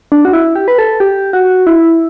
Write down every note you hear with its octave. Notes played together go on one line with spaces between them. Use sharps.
D4
F#4
E4
G4
B4
A4
G4
F#4
E4